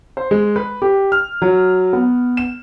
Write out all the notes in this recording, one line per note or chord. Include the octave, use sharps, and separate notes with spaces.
C5
G#3
B4
G4
F6
F#3
B3
E7